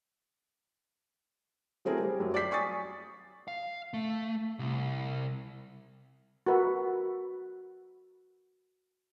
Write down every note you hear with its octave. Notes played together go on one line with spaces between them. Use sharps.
F#3 A3 C4 E4 G#4 A#4
G3 G4
F#2 F#3
D5 D6 G6 B6 C7
G#5 C#6 D#6 A6
F5
A3
C2
F#4 A#4 B4 E5